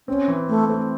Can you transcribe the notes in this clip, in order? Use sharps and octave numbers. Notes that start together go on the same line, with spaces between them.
C4 C#4
E3
A3 C4
A3 C4